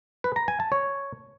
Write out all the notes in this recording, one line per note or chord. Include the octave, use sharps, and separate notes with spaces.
B4
A#5
G#5
A5
C#5